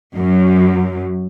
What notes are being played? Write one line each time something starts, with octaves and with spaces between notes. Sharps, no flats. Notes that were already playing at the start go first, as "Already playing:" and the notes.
F#2